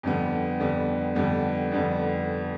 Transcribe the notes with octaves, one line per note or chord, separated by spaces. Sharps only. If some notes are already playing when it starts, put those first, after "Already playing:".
F2 D3 G3 B3
F2 D3 G3 B3
F2 D3 G3 B3
F2 D3 G3 B3